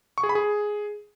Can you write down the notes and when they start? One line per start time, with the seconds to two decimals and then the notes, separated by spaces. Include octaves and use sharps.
0.18 C#6
0.23 G#4
0.29 B5
0.35 G#4